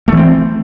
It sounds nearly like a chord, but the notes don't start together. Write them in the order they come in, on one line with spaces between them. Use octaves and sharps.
A3 E3 C4